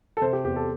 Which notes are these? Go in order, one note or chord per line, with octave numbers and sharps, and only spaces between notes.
A4
C3 C5
G4
E2 G4
A4